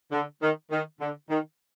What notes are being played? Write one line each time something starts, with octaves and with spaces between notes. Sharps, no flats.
D3
D#3
D#3
D3
D#3